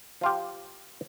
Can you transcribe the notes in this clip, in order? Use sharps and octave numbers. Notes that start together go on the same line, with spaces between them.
F3 F4 G4